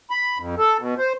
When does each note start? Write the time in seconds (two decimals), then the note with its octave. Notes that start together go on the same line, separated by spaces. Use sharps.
0.10 B5
0.38 F2
0.58 A4
0.79 B2
0.98 C5